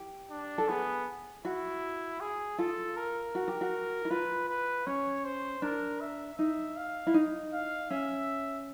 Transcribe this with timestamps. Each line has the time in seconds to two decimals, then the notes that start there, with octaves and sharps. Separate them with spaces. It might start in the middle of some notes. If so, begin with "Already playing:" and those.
Already playing: G4
0.30 D4
0.58 A4
0.68 B3 G#4
1.44 E4 F#4
2.21 G#4
2.58 F4 A4
2.97 A#4
3.35 F#4
3.48 G4
3.61 F#4
4.05 E4
4.10 F4 B4
4.48 B4
4.86 C#4 C#5
5.25 C5
5.62 D4 A#4
6.01 E5
6.38 D#4 E5
6.77 F5
7.07 E4
7.14 D#4
7.53 F5
7.91 C#4 E5